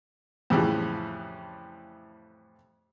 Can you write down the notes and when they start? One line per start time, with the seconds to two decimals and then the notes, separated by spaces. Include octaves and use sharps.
0.50 F2 A2 C#3 E3 G3